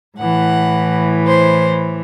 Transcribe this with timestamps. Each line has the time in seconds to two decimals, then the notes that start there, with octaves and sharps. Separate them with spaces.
0.18 A2 E3 F#5
1.27 C5